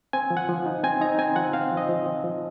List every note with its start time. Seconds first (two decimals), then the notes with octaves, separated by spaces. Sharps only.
0.13 C4 G#5
0.30 F3
0.37 F#5
0.49 F3
0.66 D#4
0.83 C4 G#5
1.01 D#4 A#5
1.19 C4 G#5
1.36 F3 F#5
1.53 C4 F5
1.71 F3
1.77 D#5
1.89 F3
2.06 C4
2.24 F3